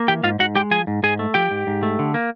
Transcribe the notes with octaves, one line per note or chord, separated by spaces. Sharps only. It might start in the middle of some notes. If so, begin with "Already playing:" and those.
Already playing: A#3
E3 G4 G5
G#2 F4 F5
G#2 F#4 F#5
G#3 G4 G5
F3 G#4 G#5
G#2
G#2 G#4 G#5
A3
F3 G4 G5
G#2
G#2
A3
D3
A#3